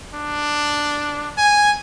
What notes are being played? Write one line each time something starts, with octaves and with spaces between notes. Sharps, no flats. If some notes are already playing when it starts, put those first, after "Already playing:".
D4
G#5